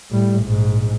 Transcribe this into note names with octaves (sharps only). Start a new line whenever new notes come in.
A2 G3
A#1 G#2